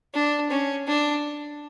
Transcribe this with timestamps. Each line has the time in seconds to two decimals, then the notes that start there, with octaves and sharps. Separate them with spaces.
0.14 D4
0.50 C#4
0.87 D4